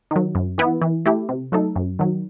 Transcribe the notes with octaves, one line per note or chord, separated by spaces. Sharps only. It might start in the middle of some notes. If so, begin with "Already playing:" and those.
D#3 F#3
F#2
E3 B3 E4
E3
A3 E4 G4
C3
F#3 A3 D#4 A4
F#2
D#3 F#3